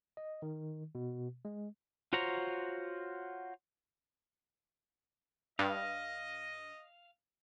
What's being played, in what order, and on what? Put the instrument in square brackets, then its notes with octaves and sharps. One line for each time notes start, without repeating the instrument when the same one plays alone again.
[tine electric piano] D#5
D#3
B2
G#3
[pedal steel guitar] F4 F#4 C5 C#5 A#5
[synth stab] G2 [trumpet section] D#5 [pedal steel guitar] F5